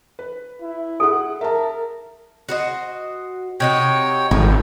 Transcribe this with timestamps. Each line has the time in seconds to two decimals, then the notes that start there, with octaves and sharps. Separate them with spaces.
0.19 B4
0.61 E4
1.00 G#4 A4 F#5
1.41 A#4 E5 A5
2.49 F#4 C5 D#5
3.60 C3 D#4 F#4 C#5 G5
4.31 G#1 A2